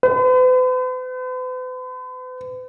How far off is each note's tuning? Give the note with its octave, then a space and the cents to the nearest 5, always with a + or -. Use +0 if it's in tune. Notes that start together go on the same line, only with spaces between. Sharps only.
B4 +45